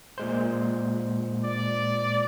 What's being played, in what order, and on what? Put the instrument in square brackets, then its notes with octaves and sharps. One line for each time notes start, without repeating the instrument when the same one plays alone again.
[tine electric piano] A#2 G#3 C5
[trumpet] D5